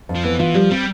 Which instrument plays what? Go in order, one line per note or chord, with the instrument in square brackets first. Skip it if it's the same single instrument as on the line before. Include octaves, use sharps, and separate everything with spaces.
[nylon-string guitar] F2
[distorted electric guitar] F3
[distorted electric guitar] E3 [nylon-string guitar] B3
[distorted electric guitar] E3 [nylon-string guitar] F4
[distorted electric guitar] F3 [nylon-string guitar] G3
[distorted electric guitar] G3 [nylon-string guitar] C4